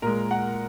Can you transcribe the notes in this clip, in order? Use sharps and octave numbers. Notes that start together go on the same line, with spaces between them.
A#2 G#3 A#4
F#5